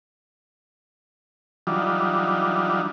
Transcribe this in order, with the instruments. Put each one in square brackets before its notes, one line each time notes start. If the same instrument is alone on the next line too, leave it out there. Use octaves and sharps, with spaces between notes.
[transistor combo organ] E3 F#3 G3 D4 D#4 F4